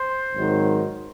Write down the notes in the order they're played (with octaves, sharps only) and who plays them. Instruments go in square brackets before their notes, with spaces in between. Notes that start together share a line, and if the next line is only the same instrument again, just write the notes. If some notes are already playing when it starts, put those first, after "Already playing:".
Already playing: [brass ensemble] C5
G#1 G#2 D#3 F#3